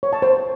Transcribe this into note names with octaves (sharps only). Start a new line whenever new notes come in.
C#5
A5
C5